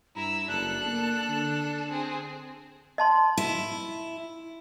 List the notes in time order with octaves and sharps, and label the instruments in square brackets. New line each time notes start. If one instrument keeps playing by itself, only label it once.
[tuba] G2 [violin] E4 E6 [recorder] A#5
[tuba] F#1 [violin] D4 A4 [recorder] F#6
[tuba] A#3
D3
[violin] C4 G#4
[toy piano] D#5 A5 C6
[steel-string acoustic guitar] E4